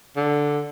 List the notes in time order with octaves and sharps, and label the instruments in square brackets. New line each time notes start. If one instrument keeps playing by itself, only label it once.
[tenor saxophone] D3